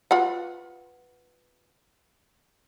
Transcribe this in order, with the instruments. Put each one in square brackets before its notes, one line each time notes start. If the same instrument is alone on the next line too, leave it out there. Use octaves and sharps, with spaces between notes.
[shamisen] F4 B4 F#5